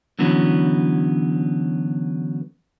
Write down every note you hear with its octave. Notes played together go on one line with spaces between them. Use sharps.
D3 E3 F#3 B3 C#4